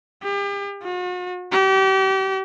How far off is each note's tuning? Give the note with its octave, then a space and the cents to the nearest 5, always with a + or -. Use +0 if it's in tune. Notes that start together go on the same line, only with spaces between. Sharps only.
G4 +40
F#4 -45
G4 -35